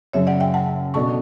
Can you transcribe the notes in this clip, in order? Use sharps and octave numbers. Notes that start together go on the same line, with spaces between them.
F#1 F#2 C#3 C#5 E5
D5 F#5
E5 G5
F#5 A5
B2 A3 D4 F#4 A5 C#6